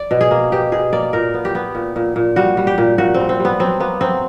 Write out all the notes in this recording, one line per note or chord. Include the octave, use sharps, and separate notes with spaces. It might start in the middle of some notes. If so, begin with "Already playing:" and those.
Already playing: D5
B2
G#4
A#3
B2 G4
B2 G#4
A#3 D5
A#2 A#4
B3
G4
B3
A#2
A#2
A#2
G3 F#4
G3
G4
A#2
A#2 F#4
C4
G3
C4
G3
B3
F#3 C4
A#3 B3
F#3 C4